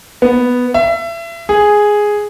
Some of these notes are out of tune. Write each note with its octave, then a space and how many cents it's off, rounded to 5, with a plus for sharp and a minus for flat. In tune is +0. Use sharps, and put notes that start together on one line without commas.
B3 +0
E5 +30
G#4 +0